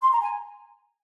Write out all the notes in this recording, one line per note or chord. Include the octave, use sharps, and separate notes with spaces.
C6
A#5
G#5